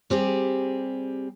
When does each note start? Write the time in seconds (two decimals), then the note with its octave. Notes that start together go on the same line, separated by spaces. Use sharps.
0.10 G3 C4 G4 G#4